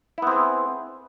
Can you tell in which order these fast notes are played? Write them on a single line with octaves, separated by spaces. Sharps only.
E4 B3 C4 G#4